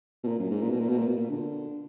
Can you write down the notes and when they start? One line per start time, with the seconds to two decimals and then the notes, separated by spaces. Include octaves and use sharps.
0.24 B2
0.28 A#2
0.39 F#2
0.51 G#2
0.62 A#2
0.71 B2
0.80 A#2
0.89 B2
0.98 A#2
1.08 B2
1.17 A#2
1.29 D3